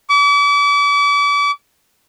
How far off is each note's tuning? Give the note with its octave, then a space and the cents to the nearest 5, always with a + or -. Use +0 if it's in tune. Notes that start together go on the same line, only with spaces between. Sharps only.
D6 -40